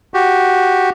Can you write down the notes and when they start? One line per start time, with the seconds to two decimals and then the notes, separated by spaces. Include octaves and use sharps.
0.14 F#4 G4